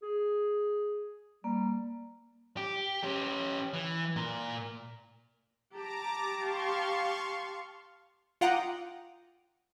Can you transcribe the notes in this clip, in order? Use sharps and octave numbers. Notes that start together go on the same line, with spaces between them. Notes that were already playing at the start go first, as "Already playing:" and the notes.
G#4
G3 A#3
G4
C#4 G4
E3
A#2 A#4
G4 A5 A#5 D6
F5 C6 C#6
F4 F#5 G5 A#5 D6 D#6